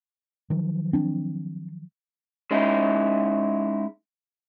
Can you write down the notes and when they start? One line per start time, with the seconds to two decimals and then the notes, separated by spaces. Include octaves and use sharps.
0.50 D#3 F3 F#3
0.93 C4 D4
2.51 G#3 C#4 D#4 E4